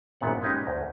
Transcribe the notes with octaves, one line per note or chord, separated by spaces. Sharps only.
G#1 F#2 A#2 B3 F#5
G#3 C#4 D#4 G4 B4
D2